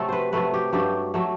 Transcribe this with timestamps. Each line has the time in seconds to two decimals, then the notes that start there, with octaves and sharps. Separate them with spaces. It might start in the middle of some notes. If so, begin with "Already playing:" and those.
Already playing: C3 F#3 A3 A4
0.09 B4 C5
0.33 C3 F#3 A3 B4
0.54 G4
0.73 G2 F#3 A3 G4
1.14 F#3 A3